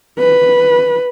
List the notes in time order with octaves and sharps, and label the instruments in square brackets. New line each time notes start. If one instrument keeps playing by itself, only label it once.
[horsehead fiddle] B4